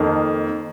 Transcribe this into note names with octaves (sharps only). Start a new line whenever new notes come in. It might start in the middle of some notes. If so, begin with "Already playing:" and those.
Already playing: F2 D#3 A#3